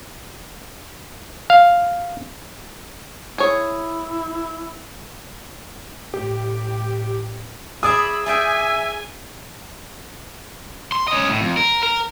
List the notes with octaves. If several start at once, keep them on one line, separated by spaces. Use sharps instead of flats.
F5
E4 G#4 C#5
A2 G4
G#4 D5 E5 B5 D#6 E6
G#4 D5 E5 G5 G#5
C6
C#4 D#5
A2
F2
A#4
A#4